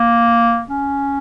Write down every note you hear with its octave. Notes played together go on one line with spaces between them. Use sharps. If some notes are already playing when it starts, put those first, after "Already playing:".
Already playing: A#3
C#4